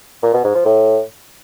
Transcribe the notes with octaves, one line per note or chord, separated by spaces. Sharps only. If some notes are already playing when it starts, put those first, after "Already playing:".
A#2
B2
G#2
F3
A2